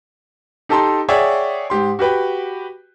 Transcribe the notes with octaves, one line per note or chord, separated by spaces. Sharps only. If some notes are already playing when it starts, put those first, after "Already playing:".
D#4 G4 A4 A5 A#5 C6
G#4 C#5 D5 E5 F#5 G5
G#2 G4 C6
F#4 G4 B4 G5